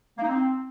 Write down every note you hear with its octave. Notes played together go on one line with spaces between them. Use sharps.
A#3
D#4
C4